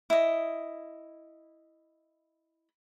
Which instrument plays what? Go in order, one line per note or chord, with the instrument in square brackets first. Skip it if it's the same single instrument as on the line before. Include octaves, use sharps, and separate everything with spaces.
[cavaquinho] E4 D#5